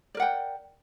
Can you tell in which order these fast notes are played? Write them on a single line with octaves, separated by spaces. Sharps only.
D5 A#4 F#5 G5